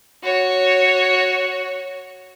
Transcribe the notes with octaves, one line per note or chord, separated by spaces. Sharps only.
F#4 C#5